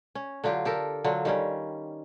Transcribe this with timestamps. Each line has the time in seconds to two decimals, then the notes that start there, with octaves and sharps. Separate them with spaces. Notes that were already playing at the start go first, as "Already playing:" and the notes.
0.15 C#4
0.44 D3 F#3 F4 G4
0.65 G4 A4 A#4
1.04 D3 F#3 F4
1.25 D#3 G3 C#4